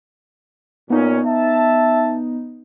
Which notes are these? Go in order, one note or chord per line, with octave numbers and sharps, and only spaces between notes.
A#2 B3 C#4 D#4
E5 A5